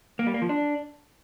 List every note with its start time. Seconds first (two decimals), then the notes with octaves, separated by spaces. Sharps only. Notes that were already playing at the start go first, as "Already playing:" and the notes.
0.19 A#3
0.27 G3
0.34 A#3
0.42 F3
0.49 D4